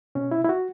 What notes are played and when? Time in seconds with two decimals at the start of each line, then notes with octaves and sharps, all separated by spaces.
0.15 B2 C#4
0.31 E4
0.45 E4
0.49 F#4